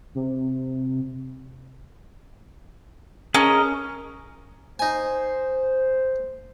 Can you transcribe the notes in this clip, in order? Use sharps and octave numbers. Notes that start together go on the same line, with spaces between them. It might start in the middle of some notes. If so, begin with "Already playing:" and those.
C3
C#4 G#4 A#4 D#5
D#4 C5 G#5